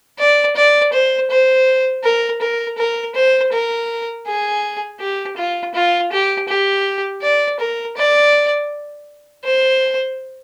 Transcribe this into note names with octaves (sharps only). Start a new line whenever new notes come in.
D5
D5
C5
C5
A#4
A#4
A#4
C5
A#4
G#4
G4
F4
F4
G4
G4
D5
A#4
D5
C5